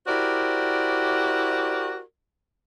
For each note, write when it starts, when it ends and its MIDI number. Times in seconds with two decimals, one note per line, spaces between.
0.07 2.00 64
0.07 2.00 66
0.07 2.00 67
0.07 2.00 70
0.07 2.00 72
0.07 2.00 74